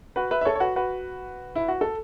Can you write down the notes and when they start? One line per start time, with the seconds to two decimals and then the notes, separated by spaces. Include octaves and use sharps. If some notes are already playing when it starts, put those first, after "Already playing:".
0.16 F#4 B4
0.31 B4 E5
0.41 E5
0.45 A4 C#5
0.55 C#5
0.60 F#4 B4
0.76 F#4 B4
1.55 E4
1.68 F#4
1.81 A4